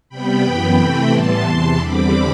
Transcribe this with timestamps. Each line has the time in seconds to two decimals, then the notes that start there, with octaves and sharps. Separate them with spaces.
0.09 C3 G3 B3 G5 B5
0.43 F#2 E3 B3 G5 B5
0.76 C3 E3 A3 C4
1.09 A2 E3 G3 B3 A5 C6
1.43 E2 C3 E3 A5 C6
1.77 E2 D3 G3 C4 B5 D6